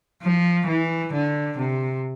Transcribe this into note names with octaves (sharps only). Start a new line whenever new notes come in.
F3
E3
D3
C3